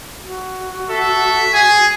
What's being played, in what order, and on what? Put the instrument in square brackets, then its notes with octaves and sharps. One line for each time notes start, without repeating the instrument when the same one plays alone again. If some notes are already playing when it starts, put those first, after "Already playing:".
[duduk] F#4
[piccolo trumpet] A4 [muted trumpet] E5
[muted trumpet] G#4 [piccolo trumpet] G#5